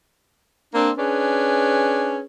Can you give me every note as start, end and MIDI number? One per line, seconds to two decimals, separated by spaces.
0.74 0.90 58
0.74 0.90 60
0.74 0.90 62
0.98 2.21 61
0.98 2.21 62
0.98 2.21 68
0.98 2.21 71